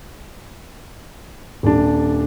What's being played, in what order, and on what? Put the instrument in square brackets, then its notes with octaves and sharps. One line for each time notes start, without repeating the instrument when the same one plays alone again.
[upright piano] D#1 D4